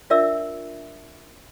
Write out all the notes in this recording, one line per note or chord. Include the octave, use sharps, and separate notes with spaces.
D4 F4 A#4 D5 E5 E6